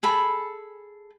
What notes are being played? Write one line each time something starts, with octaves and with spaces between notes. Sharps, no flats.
G#4 A4 B5